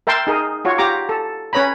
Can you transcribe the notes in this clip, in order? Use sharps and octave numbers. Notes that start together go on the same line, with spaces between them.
A#4 E5 G5 A5 C6
D#4 G#4 A#4
F4 F#4 C#5
F4 G4 A#5 D6
A4
C#4 B4 C#5 A#5 B5